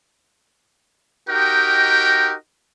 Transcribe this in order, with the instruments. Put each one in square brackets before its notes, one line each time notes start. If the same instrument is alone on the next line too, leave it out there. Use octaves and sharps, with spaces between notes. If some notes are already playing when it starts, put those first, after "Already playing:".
[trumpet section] D#4 F#4 G4 A#4 D#5 G5